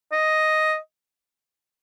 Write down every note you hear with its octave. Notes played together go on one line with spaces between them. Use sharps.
D#5